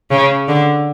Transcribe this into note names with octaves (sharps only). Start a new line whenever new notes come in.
C#3
D3